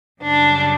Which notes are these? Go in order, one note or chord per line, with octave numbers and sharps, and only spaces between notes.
F#2 C#3 G3 D4